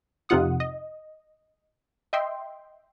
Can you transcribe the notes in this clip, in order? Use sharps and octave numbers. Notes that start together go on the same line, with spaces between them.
F2 C3 D#4 F4 F#5 D#6
D#5
D#5 E5 G5 C6